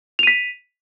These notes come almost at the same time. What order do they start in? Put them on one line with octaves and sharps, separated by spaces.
F7 D#7 B6